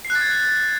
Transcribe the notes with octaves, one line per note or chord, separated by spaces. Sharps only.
C7
F#6
A6
G#6